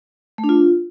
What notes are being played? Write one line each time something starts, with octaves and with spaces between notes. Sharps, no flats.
A3
D4
F4